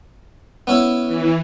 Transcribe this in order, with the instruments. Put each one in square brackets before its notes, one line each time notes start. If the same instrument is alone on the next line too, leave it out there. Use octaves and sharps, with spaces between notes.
[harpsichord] B3 C#4 E4
[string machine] E3